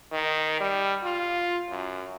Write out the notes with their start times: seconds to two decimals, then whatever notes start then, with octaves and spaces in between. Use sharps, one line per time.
0.12 D#3
0.60 G3
1.03 F4
1.70 F#2